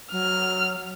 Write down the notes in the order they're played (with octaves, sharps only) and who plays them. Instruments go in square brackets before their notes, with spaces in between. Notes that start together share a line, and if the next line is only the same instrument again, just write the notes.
[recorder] F#3 [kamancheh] F6